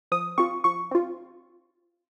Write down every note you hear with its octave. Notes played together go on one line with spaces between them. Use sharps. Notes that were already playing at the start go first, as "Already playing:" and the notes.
F3 D#6
C4 F4 C#6
F3 C#6
C4 F4